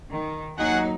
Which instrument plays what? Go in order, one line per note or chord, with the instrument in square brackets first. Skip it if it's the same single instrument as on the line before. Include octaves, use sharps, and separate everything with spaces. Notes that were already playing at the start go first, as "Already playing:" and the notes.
[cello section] D#3
[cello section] D#2 F#3 D#4 [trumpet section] F#4 G#4 F#5